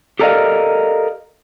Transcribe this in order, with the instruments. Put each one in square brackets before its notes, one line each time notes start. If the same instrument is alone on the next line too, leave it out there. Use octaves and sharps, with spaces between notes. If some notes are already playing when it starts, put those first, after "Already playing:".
[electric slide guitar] G4 A4 A#4 D5 D#5 F5